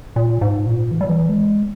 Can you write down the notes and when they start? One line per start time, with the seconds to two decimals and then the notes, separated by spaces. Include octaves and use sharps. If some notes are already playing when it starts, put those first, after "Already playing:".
0.16 A#2
0.41 G#2
0.66 A#2
0.91 E3
1.01 G3
1.09 E3
1.29 G#3